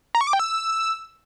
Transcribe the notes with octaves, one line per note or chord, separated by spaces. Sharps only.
A#5
C#6
D6
G5
E6